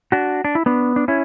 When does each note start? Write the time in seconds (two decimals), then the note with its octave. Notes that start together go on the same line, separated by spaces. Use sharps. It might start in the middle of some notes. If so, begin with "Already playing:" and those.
0.12 D4 F#4
0.45 D4
0.55 E4
0.66 B3 D4
0.96 D4
1.08 C#4 E4